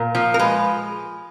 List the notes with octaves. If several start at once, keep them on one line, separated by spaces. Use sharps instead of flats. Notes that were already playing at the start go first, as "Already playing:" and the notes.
Already playing: A#2 A#4
F3
A#4
G#3 B4